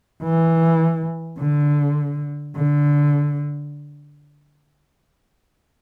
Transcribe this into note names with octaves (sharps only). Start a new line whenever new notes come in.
E3
D3
D3